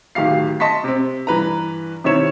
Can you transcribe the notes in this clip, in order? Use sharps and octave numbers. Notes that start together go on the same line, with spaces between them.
D1 D#3 G4 F5 C7
D#5 A5 C6 C#6 B6
C3 C4
G2 E3 B4 A#5
C3 D#3 C4 E4 C#5 E7